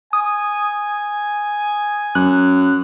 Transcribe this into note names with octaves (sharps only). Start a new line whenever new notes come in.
G#5 D#6
F#2 F#6